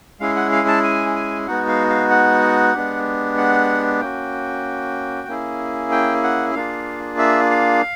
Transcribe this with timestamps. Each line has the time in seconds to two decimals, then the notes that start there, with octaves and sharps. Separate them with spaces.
0.20 G#3 C#4 E4 G#4 F5
0.36 F#5
0.52 F5
0.68 A5
0.83 G#5
1.16 G#5
1.47 G#3 B3 D#4 F#4 F#5
1.68 F5
1.90 F5
2.11 F#5
2.74 G#3 B3 D4 G4
3.37 F#5
4.01 A#3 C#4 F#4 G5
5.28 A#3 C#4 E4 G#4
5.92 G5
6.23 F#5
6.55 A#3 D4 F4 G#4 F5
7.18 E5
7.50 F5